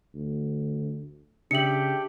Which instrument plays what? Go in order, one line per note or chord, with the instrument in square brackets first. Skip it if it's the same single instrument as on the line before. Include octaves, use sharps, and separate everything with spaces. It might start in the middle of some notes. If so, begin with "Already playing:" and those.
[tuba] D2
[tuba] C#3 [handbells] D4 E5 [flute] G4 [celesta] C#7 F#7